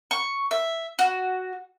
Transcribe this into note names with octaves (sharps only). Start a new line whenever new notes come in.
C#6
E5
F#4